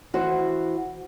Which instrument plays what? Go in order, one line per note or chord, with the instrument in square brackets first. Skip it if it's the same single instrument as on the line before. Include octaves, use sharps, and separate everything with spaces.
[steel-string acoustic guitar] E3 F#4 C5